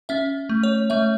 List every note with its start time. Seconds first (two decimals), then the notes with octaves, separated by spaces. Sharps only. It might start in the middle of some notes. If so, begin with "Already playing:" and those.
0.09 C#4 E5
0.49 A3
0.63 C#5
0.90 A3 E5